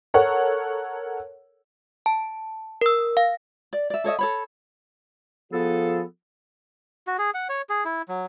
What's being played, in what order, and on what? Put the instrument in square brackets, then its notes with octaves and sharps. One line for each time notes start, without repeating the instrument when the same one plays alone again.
[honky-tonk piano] A4 A#4 C#5 F#5
[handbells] A5
A#4 E6
F5
[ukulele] D5
D5 E5
A4 C#5 D#5 E5
A4 C#5 B5
[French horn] F3 [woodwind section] B3 G#4 A4
[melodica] F#4
G#4
F#5
C#5
G#4
E4
F#3